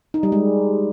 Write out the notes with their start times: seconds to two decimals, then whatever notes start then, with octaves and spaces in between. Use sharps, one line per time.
0.14 D#4
0.23 G3
0.32 G#3